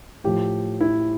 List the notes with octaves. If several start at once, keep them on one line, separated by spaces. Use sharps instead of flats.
A2 F3 G4
E4